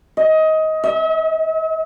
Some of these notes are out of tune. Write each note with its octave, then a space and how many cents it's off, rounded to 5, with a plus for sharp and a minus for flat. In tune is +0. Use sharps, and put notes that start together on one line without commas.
D#5 +20
E5 -45